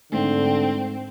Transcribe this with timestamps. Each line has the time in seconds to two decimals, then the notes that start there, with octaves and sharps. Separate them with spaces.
0.12 G#2 D3 A3 C4